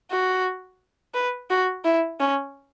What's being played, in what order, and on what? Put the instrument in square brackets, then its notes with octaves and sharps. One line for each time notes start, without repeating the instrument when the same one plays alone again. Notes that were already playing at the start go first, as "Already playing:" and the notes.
[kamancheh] F#4
B4
F#4
E4
C#4